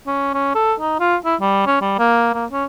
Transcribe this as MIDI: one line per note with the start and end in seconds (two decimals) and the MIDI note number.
0.06 0.33 61
0.34 0.55 61
0.55 0.74 69
0.80 0.97 63
1.00 1.16 65
1.25 1.35 64
1.40 1.65 55
1.67 1.76 61
1.81 1.98 55
1.99 2.30 58
2.34 2.45 58
2.52 2.65 61